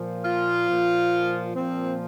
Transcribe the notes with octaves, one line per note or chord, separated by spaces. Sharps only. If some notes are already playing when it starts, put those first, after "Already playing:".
Already playing: A#2 F3
F4
A#2 F3
A#2 F3 C4